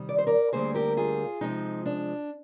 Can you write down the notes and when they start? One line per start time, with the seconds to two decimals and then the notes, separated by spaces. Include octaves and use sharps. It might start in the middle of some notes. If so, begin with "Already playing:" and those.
Already playing: C3 D#3 G3
0.09 D5
0.18 C5
0.27 A#4 D5
0.52 D2 D3 G3 A#3 G#4 C5
0.74 G4 A#4
0.97 F4 G#4
1.41 C3 F3 G#3 D#4
1.86 D4